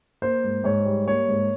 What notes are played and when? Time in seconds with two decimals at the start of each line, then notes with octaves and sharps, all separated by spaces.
0.22 A#3 C5
0.44 G#2
0.64 G#2 C#5
0.85 G3
1.07 A#3 C#5
1.28 G#2